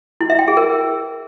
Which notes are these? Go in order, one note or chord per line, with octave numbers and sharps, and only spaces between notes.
E4
E5
G5
G#4
A#4